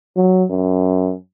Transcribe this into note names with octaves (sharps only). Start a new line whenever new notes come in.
F#3
F#2